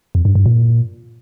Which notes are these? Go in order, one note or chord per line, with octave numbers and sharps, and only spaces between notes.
F2
G2
G2
A#2